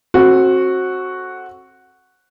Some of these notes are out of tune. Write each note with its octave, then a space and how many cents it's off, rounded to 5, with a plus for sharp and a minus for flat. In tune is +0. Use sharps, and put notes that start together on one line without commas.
C4 +35 F#4 +0 A4 +0